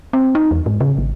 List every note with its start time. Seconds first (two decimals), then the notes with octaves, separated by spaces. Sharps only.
0.13 C4
0.35 D#4
0.51 E2
0.66 G#2
0.81 C#3
0.98 G#1